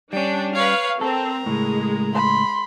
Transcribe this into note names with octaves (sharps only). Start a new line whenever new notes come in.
G3 C#4 D4 G5
B4 C#5 F5
C4 A4 A#4
C#2 A2 G#3
B5 C6